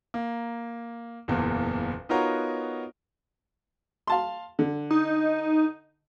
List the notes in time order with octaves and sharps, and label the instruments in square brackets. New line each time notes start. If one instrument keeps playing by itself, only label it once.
[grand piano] A#3
F#1 E2 A#2
B3 D#4 F4 F#4 A#4 C#5
[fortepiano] F5 A5 C6
D3
[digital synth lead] D#4